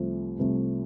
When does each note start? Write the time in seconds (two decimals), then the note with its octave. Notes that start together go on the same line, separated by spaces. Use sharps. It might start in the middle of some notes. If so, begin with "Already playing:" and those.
Already playing: C2 C3 F3 A3
0.39 C2 C3 F3 A3